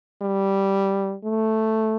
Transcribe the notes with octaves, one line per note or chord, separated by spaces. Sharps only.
G3
A3